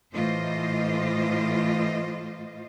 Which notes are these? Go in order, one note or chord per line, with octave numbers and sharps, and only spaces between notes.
A2 E3 A3 F4 C5 D#5